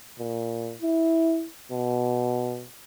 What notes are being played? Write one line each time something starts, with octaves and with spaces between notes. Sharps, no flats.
A#2
E4
B2